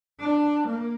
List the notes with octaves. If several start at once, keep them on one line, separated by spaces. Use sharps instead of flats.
D4
A#3